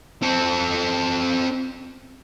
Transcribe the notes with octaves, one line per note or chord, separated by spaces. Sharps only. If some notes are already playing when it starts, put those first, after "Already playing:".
C4 A4